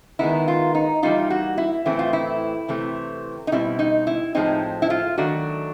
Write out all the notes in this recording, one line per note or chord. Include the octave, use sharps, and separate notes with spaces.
D#3 G#3 B3 D#4 E4
F4
D#4
E3 G3 A#3 D#4 F4
F#4
E4
A2 E3 A3 C4 E4
F4
E4
C3 E3 A3 C4
D#4
B2 G3 C4 E4
D#4
E4
A2 F3 G#3 C4 D#4
E4
F4
D#3 F#3 A3 D4 F#4